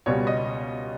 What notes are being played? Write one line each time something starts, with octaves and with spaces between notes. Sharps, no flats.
C#2 B2 G3 C#5
D#5